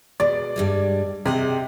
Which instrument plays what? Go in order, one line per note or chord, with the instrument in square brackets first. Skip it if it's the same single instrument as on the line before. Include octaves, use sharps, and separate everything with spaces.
[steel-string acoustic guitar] B2 G#3 [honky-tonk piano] D5
[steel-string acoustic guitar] G2 G3 G#3
[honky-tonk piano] C3 [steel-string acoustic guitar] G#4 D#5 F#5